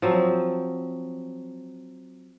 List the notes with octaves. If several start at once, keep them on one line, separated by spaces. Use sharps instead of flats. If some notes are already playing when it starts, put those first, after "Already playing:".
F3 F#3 C4